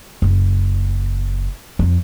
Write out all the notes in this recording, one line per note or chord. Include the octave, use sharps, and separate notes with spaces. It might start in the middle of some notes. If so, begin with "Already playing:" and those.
F#1
F2